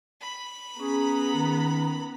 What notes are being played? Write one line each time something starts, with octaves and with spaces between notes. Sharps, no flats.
B5
B3 C#4 G#4 A#5
D#3